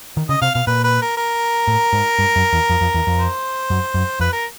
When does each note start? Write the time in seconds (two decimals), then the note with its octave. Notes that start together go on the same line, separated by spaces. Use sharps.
0.17 D#3
0.29 C#3 D#5
0.42 C3 F5
0.54 B2 F5
0.67 A#2 B4
0.84 B4
1.02 A#4
1.17 A#4
1.68 A2
1.93 G#2
2.19 G2
2.36 F#2
2.53 E2
2.70 F2
2.81 F2
2.94 E2
3.07 F2
3.19 C5
3.70 F#2
3.94 F#2
4.20 F2 B4
4.33 A#4